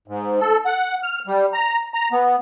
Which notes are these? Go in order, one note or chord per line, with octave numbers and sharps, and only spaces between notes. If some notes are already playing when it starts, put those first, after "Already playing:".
G#2
A4
F#5
F6
G3
A#5
A#5
B3